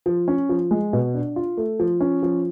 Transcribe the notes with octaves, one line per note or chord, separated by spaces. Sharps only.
F3
C#4
F3
G#3
B2
D4
F4
A3
F3
C#4
F3